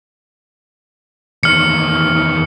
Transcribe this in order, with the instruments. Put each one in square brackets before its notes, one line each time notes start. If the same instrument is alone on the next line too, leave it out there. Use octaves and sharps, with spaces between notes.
[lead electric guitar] E2 D#3 [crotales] F6 C#7